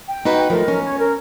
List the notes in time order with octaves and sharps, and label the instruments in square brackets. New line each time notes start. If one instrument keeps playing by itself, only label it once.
[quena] G5
[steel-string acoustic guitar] D#4 F#4 B4
[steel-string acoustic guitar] F3 A3 [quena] A#4
[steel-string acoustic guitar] C#4
[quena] C#5
A#4